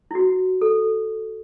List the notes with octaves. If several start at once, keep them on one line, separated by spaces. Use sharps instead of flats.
E4
F#4
A4